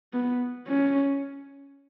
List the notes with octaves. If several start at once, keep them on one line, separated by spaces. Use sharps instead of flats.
B3
C#4